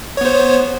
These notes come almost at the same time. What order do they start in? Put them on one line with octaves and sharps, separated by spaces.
C#5 B3 C5